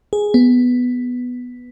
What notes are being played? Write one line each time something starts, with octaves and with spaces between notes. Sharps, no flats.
G#4
B3